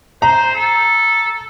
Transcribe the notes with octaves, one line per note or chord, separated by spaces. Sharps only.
C5 A#5
A4